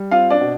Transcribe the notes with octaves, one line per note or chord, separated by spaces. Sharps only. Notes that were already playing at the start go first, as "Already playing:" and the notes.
Already playing: G3
C4 F4 F5
D4 D5
B2